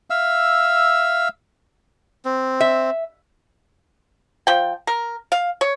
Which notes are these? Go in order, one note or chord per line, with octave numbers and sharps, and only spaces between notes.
E5 F5 E6
C4
E5
F3 G5
A#4
F5
C#5